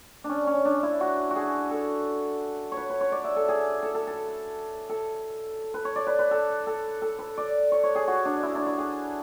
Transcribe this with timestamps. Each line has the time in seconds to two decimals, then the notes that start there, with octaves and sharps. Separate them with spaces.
0.24 C#4 D4
0.47 C#4
0.65 D4
0.83 E4
1.01 F#4
1.31 F#4
1.36 G#4
1.71 A4
2.72 C#5
2.77 B4
2.90 B4
3.01 C#5
3.12 D5
3.24 E5
3.36 A4
3.48 G#4
3.83 A4
3.94 A4
4.07 A4
4.89 A4
5.74 B4
5.85 C#5
5.96 D5
6.07 B4
6.19 B4
6.31 A4
6.67 A4
7.02 A4
7.19 B4
7.37 D5
7.72 C#5
7.83 C#5
7.95 G#4
8.08 F#4
8.25 D4
8.43 E4
8.55 D4
8.66 E4
8.78 G#4